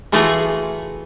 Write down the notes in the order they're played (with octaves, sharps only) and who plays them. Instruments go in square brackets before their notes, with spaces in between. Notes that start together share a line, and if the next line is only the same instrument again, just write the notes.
[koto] E3 A3 F4 F#4 G#4